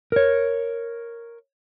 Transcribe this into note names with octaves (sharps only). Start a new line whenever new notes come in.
A#4 C#5